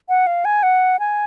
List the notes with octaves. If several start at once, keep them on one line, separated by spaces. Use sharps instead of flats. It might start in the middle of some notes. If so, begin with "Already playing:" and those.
F#5
F5
G#5
F#5
G#5